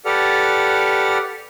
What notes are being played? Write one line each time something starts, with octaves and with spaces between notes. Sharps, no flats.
G4 A4 B4 D5 F#5 F6